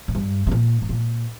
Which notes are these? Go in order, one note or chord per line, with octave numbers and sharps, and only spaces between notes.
A2
G2
C3
A#2
A2
A#2